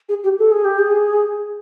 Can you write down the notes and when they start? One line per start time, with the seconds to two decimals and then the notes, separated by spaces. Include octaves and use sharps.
0.09 G#4
0.24 G4
0.39 A4
0.52 G#4
0.65 G4
0.79 G#4